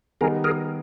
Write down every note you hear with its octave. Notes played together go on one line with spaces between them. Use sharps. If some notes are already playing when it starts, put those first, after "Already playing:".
D#3 G3 B3 D#4 G#4 A#4
G#4 A#4